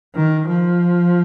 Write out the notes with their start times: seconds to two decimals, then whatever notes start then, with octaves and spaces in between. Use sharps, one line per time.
0.15 D#3
0.48 F3